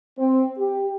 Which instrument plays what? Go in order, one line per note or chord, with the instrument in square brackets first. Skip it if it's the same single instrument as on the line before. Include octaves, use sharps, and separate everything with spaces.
[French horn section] C4
G4